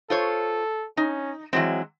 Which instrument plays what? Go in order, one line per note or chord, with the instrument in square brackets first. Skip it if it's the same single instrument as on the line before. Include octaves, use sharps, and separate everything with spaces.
[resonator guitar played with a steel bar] F4 C5 C#5 [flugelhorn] A4
[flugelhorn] C#4 [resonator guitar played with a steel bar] D#4
[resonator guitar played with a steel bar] E3 F#3 C4 [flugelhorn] G#3